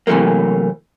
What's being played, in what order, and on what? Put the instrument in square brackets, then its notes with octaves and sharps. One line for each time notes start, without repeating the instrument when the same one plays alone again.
[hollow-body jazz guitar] C3 E3 F#3 A3 A#3